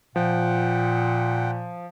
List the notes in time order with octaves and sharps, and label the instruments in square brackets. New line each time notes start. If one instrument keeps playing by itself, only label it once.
[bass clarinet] A#2 [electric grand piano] F3 [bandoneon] F#5 G5